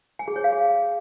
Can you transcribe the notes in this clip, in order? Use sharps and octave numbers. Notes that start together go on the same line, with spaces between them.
G#5
G#4
C#5
F5
G#4